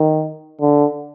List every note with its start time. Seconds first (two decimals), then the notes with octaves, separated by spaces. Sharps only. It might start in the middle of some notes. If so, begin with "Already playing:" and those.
Already playing: D#3
0.61 D3